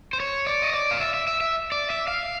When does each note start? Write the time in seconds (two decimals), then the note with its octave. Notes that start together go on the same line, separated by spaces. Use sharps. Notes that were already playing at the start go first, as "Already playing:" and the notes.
0.13 C5
0.20 C#5
0.47 D5
0.62 D#5
0.73 D5
0.91 F5
1.00 E5
1.14 E5
1.27 E5
1.41 E5
1.72 D5
1.90 E5
2.08 F5